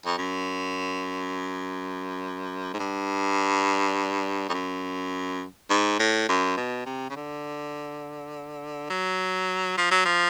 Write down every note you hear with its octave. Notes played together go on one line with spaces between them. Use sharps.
F2
F#2
G#2
G2
F2
F#2
G#2
A2
F#2
B2
C3
C#3
D3
F#3
F3
F#3
F3